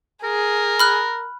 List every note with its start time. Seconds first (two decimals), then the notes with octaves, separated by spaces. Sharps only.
0.23 G#4 A#4
0.79 B5 F6 F#6